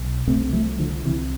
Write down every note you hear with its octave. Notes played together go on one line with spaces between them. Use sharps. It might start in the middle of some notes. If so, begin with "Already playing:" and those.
Already playing: B1
C2 C3 A3 C4
F3 A3
D3 F3
C2 C3 E3